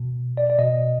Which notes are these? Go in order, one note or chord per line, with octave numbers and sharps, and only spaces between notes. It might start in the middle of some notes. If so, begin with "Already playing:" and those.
Already playing: B2
D5
D5
B2 D#5